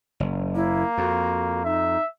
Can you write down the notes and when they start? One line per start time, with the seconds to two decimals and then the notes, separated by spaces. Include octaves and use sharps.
0.20 F#1
0.55 A#3 E4
0.98 F2 F#4
1.65 D#4 E5